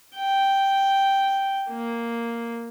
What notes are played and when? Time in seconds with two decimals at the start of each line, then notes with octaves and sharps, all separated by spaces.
0.16 G5
1.70 A#3